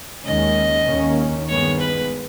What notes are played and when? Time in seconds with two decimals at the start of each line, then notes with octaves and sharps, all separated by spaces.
0.24 D#2 D#3 G#3 C#4 D#5
0.86 D#2 D#3 A#3 C#4
1.48 G2 D#3 G#3 B3 C#5
1.80 B4